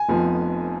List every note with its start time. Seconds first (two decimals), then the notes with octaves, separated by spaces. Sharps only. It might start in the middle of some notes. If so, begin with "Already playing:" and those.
Already playing: G#5
0.09 F1 F2 F3 B3